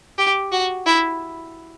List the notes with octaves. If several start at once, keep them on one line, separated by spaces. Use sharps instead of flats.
G4
F#4
E4